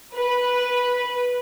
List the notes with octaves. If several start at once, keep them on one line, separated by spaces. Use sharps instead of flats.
B4